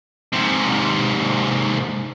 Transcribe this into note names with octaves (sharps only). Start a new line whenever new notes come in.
G#2 C3